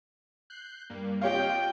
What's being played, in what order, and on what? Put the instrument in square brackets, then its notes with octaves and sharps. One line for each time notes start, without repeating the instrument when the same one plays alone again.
[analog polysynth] F#6 G6 C7
G2 G3 A#3
[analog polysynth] F4 D#5 [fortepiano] G4 C#5 F5 [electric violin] G5